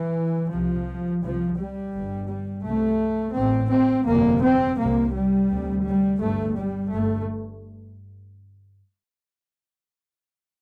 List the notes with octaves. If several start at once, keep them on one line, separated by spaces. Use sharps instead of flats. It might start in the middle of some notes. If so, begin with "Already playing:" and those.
Already playing: E3
C2 C3 F3
C2 C3 F3
G3
G1 G2
G3
C2 C3 A3
A1 A2 C4
C4
G1 F2 C3 A#3
C4
C2 C3 A#3
G3
D2 C3
G3
G1 G2 A3
G3
G1 G2 A3